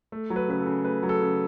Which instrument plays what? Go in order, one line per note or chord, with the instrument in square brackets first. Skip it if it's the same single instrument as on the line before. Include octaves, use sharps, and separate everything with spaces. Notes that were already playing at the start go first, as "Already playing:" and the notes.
[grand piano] A3
F#3
B4
C#3 B4
A4
C#3
A3 B4
F#3
A4
C#3